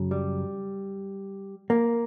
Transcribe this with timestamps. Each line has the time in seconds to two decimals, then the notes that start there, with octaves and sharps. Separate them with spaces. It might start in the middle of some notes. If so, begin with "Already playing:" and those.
Already playing: F#2 C#3 F#3
0.11 G3
1.70 A#3